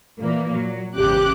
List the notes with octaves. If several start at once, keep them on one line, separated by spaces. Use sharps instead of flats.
A#2 E3 A#3
F#3
G#1 E2 C#3 G4 D6 F#6